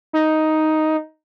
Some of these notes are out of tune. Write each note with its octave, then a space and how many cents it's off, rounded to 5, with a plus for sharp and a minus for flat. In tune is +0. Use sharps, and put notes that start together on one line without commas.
D#4 +5